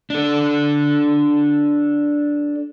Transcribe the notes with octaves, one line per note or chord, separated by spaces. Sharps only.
D4 A4